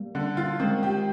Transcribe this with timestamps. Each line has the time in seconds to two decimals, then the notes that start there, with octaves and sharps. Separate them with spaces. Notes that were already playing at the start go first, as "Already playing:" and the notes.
Already playing: G3 A#3
0.15 D3
0.37 F4
0.60 D#3 G#3 C4
0.83 G4